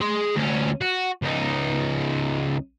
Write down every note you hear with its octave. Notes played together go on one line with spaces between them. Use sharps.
G#4 C6
D2 C#4
F#4
C#2 D#4